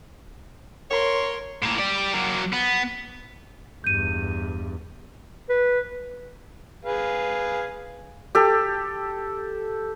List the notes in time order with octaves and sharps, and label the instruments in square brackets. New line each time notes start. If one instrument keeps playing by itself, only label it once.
[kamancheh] A#4 C6 [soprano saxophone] C#5
[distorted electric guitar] A2 A#3
G4 D5
F#3 A#3
B3
[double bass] E2 G2 [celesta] G6 D#7
[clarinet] B4
[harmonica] G#4 B4 F5
[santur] G4 A4